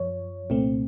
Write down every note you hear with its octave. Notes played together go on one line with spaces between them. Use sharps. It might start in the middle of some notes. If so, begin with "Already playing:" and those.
Already playing: F#2 F3 C#5
C2 A#2 A3 C4